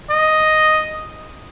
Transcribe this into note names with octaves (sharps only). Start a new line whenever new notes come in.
D#5